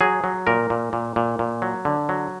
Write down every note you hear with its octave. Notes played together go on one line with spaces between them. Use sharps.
F#3 G#4
F#3
A#2 A#4
A#2
A#2
A#2
A#2
F#3
D3
F#3